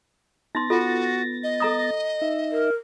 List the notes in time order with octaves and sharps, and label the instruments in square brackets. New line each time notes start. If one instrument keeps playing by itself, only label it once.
[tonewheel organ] B3 A6 A#6 [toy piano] D#4 C6
[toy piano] F4 A4 [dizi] F#4
[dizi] D#5
[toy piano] A4 A#5 D#6
[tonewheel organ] D#4 E5
[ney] A#4